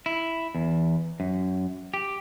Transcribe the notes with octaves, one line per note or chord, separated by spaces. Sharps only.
E4
E2
F#2
G4